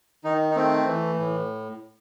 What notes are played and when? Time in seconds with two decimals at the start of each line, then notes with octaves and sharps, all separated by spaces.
0.24 D#3 D#4
0.51 D#4
0.56 A3 C4
0.87 E3
1.19 A2